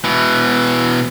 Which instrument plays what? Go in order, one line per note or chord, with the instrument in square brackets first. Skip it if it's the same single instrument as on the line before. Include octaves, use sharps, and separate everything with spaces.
[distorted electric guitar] B2 E3